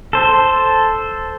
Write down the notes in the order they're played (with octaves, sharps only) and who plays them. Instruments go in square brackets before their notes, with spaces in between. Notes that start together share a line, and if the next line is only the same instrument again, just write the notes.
[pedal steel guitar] A4 C5